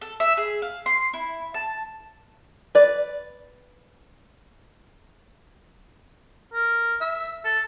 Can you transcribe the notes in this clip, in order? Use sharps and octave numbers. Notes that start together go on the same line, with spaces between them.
A4
E5
G#4
F5
C6
E4
A5
B4 D5
A#4
E5
A4